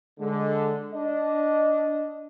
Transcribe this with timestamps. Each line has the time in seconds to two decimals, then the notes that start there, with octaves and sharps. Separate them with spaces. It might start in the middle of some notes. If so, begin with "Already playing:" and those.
0.20 D3 G#3
0.94 D4 D#5